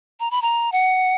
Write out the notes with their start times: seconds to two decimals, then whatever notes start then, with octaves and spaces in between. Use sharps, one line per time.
0.20 A#5
0.31 B5
0.42 A#5
0.72 F#5